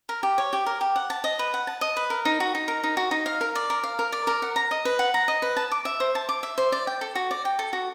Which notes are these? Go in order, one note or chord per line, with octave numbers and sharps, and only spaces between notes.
A#4
G4
C#5
G4
A#4
G4
F#5
A5
D#5
B4
F#5
A5
D#5
B4
A#4
D#4
F#4
D#4
A#4
D#4
F#4
D#4
F5
A#4
D5
A#4
F5
A#4
D5
A#4
F#5
A#5
D#5
B4
F#5
A#5
D#5
B4
A5
D6
E5
C5
A5
D6
E5
C5
D5
G5
A4
F#4
D5
G5
A4
F#4